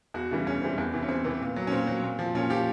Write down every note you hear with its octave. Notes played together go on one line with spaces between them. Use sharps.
E2 F#4
C#3 E3 G3 D4
E2 C#4
C#3 E3 G3 C4
E2
C3 E3
C#4
E2 C4
C3 E3 B3
A#2
F#3
C#4
A#2 C4
F#3 C4
A#2
F3
A#2 C#4
F3 G4